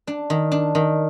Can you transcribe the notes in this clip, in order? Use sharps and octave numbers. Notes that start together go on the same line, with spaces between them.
D4
D#3
D4
D#3